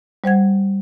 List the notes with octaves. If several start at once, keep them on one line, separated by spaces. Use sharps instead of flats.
G3 C5 F#5 G#6